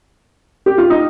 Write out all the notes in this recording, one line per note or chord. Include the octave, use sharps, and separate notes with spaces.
G4
F4
D#4